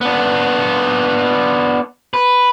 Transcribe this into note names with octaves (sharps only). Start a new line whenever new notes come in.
B3 D4
B4